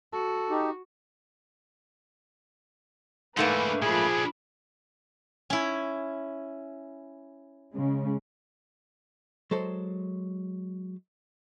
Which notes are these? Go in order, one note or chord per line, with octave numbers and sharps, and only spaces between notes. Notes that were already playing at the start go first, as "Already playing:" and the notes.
F#4 A4
D#4 G4
G#2 D3 E3 A3 A#3 B4
A#2 F3 D4 G#4 B5
C#4 E4
C#3 G#3
F#3 G#3 A4 C5